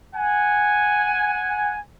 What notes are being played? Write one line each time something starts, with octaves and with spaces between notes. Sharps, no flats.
F#5 G#5